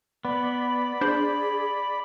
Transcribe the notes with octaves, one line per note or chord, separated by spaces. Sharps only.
B3 D5 B5
D4 G#4 C5 G6